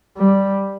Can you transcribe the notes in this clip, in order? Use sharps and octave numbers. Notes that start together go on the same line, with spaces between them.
G3